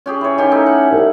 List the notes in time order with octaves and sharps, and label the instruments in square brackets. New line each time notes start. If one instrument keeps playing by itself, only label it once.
[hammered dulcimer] C#4 G4 G#4
E3 C#5
[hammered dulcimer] D#3 G4 G#5 [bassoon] C#4
[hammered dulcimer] A3 D#4 E4
F#5
[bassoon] C2